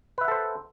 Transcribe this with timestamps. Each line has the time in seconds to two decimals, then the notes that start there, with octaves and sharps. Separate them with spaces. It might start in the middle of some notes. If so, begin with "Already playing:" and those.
0.18 B4
0.21 E5
0.25 F#5
0.28 A4
0.32 C5